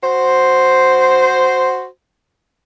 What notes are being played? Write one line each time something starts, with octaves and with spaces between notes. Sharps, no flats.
F#4 C5